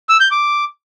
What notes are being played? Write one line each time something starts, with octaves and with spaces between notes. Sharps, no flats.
E6
G6
D6